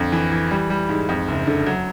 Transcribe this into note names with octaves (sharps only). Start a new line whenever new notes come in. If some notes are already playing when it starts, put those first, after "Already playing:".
Already playing: F2 D3
E3
E3
G3
G3
G#2
F2
F#1
D3
F#3